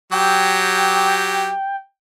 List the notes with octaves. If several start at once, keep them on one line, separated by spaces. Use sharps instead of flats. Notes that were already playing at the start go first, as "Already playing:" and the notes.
F#3 G4 G5